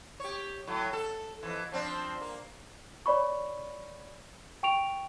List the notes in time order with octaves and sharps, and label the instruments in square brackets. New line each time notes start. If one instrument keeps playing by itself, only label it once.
[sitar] G4 C#5
A2 F#3
A4
F2 E3
F3 C4 D4
A#3
[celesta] C#5 D5 B5 C#6
G5 C#6 D7 F7